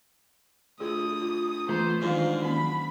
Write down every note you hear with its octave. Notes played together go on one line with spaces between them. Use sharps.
D2 F4 G#4 D#6
F4
E3 A3 B3 F4 C5 A#5
G#2 D#3 F#3 D4 E4 F4 F5
D#3 A#3 C#4 B5